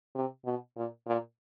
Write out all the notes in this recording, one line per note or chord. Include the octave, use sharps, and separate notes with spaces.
C3
B2
A#2
A#2